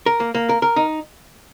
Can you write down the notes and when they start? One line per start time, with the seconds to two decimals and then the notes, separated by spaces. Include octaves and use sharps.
0.06 A#4
0.20 A#3
0.35 A#3
0.49 A#4
0.62 A#4
0.76 D#4